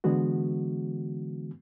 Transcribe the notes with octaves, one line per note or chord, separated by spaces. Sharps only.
D3 E3 G#3 B3 F#4